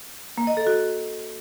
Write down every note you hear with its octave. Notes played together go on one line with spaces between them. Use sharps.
A#3
D#5
A4
F#4